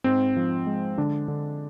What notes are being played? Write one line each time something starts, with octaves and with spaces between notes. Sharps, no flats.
G#2 C4
F3
G#3
D3 D4
D3